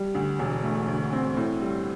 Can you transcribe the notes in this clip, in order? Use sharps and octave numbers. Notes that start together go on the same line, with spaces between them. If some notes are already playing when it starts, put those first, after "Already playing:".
Already playing: G3
D2
E1
A3
D2
C4
A2
G3